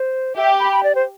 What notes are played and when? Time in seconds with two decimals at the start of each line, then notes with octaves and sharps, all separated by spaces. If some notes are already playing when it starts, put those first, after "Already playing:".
Already playing: C5
0.36 G4 E5
0.60 B5
0.72 B5
0.83 D5
0.95 C5